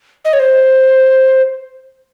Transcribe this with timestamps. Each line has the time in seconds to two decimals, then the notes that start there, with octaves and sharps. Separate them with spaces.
0.25 D#5
0.33 C#5
0.39 C5